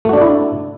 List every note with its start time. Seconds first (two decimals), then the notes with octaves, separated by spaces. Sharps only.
0.05 A3
0.09 F#4
0.13 D4
0.17 D5
0.21 E4